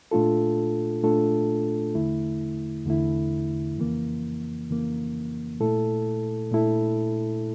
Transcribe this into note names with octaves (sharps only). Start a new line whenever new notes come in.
A#2 A3 D4 F4 A4
A#2 A3 D4 F4 A4
E2 D3 A3 E4
E2 D3 A3 E4
F2 C#3 E3 A#3
F2 C#3 E3 A#3
A#2 A3 E4 A4
A#2 A3 E4 A4